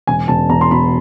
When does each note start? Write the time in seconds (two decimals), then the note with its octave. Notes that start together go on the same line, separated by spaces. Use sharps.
0.07 E1 G#5
0.28 E1 A5
0.49 E2 A#5
0.61 C6
0.71 B2 B5